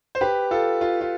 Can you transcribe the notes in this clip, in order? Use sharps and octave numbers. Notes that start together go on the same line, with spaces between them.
C5
G4 B4
F4 A4
F4
F4